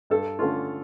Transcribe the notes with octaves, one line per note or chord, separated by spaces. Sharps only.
G2 A4
D3 A3 C#4 F4